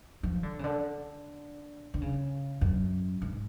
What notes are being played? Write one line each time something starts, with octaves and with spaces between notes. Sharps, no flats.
F3
D3
C#3
D3
D3
C#3
F#2
G#2